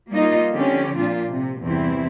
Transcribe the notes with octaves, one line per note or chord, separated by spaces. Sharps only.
G3 A#3 D#4 F4 D#5
D3 F3 C4 C#4 G4
A#2 D4 F4
C3
E2 G2 C3 C4 E4